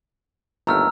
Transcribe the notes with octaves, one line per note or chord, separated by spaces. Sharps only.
G1 D#2 A3 A#5 E6 F6